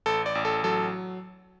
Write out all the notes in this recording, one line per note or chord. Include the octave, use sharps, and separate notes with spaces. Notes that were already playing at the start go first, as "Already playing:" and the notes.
A1 A4
D5
A1
A4
F#3 A4